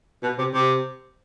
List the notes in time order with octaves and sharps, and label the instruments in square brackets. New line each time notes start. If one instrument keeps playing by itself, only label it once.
[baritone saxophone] B2
C3
C3